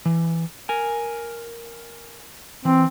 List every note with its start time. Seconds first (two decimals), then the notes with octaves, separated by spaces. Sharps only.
0.05 E3
0.69 A#4 G#5
2.65 E3 C4